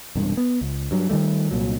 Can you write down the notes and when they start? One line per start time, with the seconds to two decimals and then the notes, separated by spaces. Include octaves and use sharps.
0.16 E1 C2 G2
0.37 B3
0.61 C#2
0.91 G2 F#3
1.10 D#3 E3 G3 A3
1.51 C2 A#2 F#3